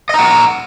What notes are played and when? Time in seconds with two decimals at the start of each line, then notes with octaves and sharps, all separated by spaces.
0.09 D#5
0.14 A#5
0.19 F#5